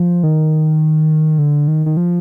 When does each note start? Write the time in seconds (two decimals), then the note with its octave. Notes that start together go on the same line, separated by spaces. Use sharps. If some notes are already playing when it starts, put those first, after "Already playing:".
Already playing: F3
0.23 D#3
1.38 D3
1.68 D#3
1.86 D#3
1.97 F3